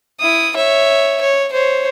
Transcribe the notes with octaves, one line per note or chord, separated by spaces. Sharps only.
E4 D#6
C#5 E5
C#5
C5 C#5